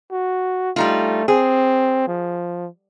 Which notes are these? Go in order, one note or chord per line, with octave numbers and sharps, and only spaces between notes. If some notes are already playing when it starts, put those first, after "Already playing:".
F#4
G3 A3 D#4 F4
C4 G#4
F3